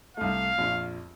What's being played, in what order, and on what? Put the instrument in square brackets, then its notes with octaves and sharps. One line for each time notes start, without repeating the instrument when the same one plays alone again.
[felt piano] C2 A3 [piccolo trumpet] F5
[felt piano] A#1 F2